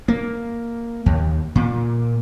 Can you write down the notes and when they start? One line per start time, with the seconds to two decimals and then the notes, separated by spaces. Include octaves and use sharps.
0.08 A#3
1.06 D#2
1.55 A#2